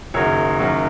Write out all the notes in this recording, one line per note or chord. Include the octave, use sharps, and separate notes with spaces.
F#1 F#2 D#3 F#3 C#5
F#1 F#2 D#3 F#3